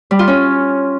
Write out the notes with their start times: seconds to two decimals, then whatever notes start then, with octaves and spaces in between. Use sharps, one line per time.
0.11 G3
0.19 F4
0.28 C#4